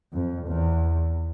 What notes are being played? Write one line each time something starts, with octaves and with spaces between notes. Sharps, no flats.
F2
E2